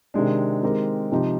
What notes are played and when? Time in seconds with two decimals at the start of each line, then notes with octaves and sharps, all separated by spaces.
0.14 C3 D#3 G#3 D4
0.63 D#3 G#3 C4 G4 A#4
1.11 C3 F3 C4 D#4 G4